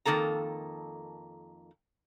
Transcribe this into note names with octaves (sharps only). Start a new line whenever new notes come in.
F2 D#3 A#3 A4 A#5